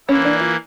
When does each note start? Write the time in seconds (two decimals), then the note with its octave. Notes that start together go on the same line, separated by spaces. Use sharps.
0.08 E3 A#3 C#4 E4
0.25 D4
0.40 F4